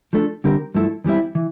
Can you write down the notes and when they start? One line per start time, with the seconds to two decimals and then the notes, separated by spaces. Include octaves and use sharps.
0.13 F3 A3 D4 A4
0.44 D3 G3 C4 G4 A#4
0.75 G2 F3 A3 E4 A4
1.04 E2 E3 G3 C4 E4
1.35 E3